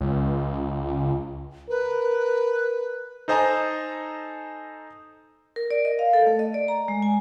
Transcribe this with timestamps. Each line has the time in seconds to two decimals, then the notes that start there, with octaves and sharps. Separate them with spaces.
0.01 C#2
1.70 A#4 B4
3.28 D#4 A4 C5 D#5 G#5 A#5
5.56 A#4
5.71 D5
5.85 D#5
5.99 F5
6.13 A4
6.26 A3
6.39 D#5
6.54 D5
6.68 A#5
6.88 G#3
7.02 G#5